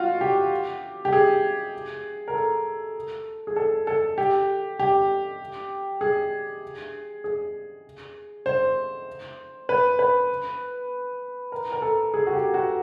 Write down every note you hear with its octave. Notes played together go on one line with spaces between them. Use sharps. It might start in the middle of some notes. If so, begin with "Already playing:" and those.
Already playing: F4 F#4
G4
G4
G#4
A#4
A4
G#4
A4
A4
G4
G4
G#4
G#4
C5
B4
B4
A#4
A#4
A4
G#4
F#4
G4
F#4